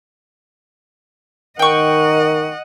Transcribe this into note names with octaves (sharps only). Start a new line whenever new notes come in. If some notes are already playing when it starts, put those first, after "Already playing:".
D#3 A#4 D#5 F#5 G5 C#6